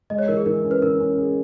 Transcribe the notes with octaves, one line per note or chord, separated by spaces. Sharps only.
G#3 D#5
C#5
E3 A#4
G#4
E3 A#4
C#4
B4
E3 A#4
C#4
G#4